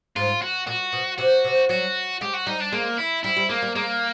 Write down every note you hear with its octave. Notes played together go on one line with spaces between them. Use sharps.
G#2 F4
F#4
A#2 F#4
B2
C3 F#4
C3
F#3 F#4
G#3 G4
F#4
G3 D#4
D4
G#3 A#3
E4
G3 E4
G3
G#3 A#3
G3
G#3 A#3